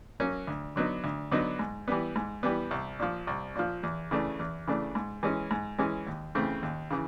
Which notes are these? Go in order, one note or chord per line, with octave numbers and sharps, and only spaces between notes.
F#3 A#3 C#4
D2
D3 F#3 B3 D#4
D2
D3 F#3 B3 D#4
G#2
E3 G3 B3
G#2
E3 G3 B3
C2
A#2 F3
C2
A#2 F3
E2
C#3 E3 A3 D4
E2
C#3 E3 A3 D4
G#2
E3 G#3 C#4
G#2
E3 G#3 C#4
D#2
C#3 E3 A3 C4
D#2
C#3 E3